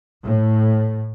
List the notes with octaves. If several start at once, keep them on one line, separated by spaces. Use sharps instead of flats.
A2